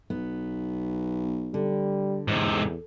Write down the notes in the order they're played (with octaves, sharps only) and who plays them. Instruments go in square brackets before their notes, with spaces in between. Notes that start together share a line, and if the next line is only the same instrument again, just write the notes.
[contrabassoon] B1 [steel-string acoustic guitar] B3
[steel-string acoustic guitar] D3 [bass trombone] G3
[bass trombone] E2 [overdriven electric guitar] G#2 C3